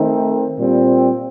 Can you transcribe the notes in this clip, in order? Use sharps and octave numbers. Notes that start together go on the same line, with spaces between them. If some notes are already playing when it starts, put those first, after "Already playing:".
Already playing: D#3 A3 C4 D#4
A#2 G3 C4